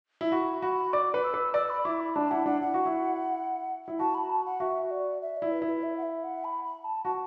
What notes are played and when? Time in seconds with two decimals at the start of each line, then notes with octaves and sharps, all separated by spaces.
0.21 E4
0.32 F#4 B5
0.62 F#4 B5
0.93 D5 D6
1.14 B4
1.24 E6
1.34 B4
1.54 D5 E6
1.70 B5
1.85 E4 D6
2.00 B5
2.16 D4 A5
2.31 E4 F#5
2.46 D4 F#5
2.61 E4 F#5
2.74 F#4
2.85 E4
3.88 E4
3.99 F#4 A5
4.14 B5
4.30 A5
4.45 F#5
4.60 F#4 E5
4.91 D5
5.22 E5
5.37 D5
5.42 E4
5.52 B4
5.62 E4
5.67 B4
5.83 E5
5.98 F#5
6.03 E5
6.24 F#5
6.44 B5
6.64 B5
6.84 A5
7.05 F#4 A5